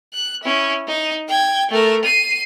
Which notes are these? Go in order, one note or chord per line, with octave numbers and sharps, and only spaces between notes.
F#6
C#4 E4
D#4
G5 G#6
A3 A#4
C7 D#7